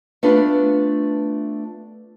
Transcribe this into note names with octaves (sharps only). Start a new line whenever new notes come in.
A3 B3 D4 F4 B4